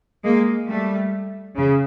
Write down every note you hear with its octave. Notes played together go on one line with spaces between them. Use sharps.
G#3 A#3
G3 A3
C#3